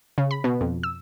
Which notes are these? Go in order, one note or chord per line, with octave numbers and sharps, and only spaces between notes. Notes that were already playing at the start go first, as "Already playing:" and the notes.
C#3
B5
B2
F2
E6